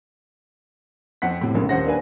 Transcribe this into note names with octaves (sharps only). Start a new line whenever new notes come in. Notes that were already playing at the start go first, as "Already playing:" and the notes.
F2 C4 F#5 B6
A2 C3
F1 A#1 C#3 G#3 A#3
D#1 C5 F#5 A#6
A#3 D4 B4 G#5